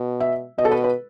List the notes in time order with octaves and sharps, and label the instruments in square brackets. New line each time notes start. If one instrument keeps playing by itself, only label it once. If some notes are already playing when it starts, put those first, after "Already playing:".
Already playing: [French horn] B2
[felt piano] E5
[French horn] B2 [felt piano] D#5
[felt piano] A4
B4
B4